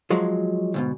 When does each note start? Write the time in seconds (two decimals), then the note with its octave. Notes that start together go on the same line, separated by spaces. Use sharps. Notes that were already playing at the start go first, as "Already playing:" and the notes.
0.10 F3 F#3 G#3
0.74 D2 G#2 B2